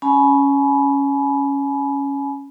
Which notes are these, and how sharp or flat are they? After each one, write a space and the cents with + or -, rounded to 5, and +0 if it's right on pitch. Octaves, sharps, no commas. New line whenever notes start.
C#4 +0 G#5 +30 B5 -10